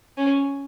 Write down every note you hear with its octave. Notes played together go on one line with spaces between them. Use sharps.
C#4